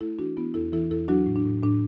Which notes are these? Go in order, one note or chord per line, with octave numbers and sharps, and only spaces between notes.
A3 E4 A4
E3 D4 F#4
E3 B3 E4
E2 E4 A4
E3 E4 A4
E2 E4 A4
F#3 D4 F#4
A2
D4
A2
A2 D4